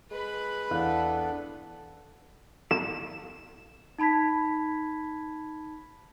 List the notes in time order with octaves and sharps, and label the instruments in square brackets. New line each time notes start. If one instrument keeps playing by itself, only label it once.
[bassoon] G#3 [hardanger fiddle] B4 B5
[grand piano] E2 F5 F#6 [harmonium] B3 D4 A4
[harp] E7
[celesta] D#4 A5 B5 G#6 B6